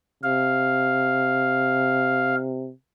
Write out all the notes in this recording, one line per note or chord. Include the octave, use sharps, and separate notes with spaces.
C3 F5